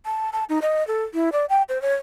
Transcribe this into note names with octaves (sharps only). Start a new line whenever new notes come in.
A5
A5
D#4
D#5
A4
E4
D5
G5
C5
C#5